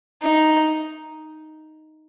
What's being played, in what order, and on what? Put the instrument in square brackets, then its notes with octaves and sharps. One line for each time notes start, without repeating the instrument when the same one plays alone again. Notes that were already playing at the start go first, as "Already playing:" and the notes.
[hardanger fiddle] D#4